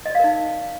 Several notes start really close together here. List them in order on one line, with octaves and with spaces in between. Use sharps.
D#5 D5 F5 A#4 D#4